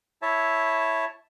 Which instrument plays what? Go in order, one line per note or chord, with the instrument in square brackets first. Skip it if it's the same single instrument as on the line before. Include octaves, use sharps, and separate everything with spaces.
[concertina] E4 C#5 E5 A5